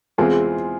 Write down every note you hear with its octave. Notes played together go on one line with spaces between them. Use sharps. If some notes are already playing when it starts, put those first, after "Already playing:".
E2 C3 E3 G#3 C4 F4 G#4